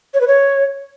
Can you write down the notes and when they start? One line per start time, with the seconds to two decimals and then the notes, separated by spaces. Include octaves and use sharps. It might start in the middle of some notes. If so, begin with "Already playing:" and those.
0.14 C#5
0.21 B4
0.28 C#5